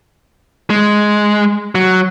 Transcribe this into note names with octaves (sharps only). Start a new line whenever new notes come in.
G#3
F#3